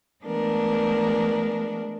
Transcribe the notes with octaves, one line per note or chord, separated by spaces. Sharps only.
E3 G#3 A3 B3 D4 A#4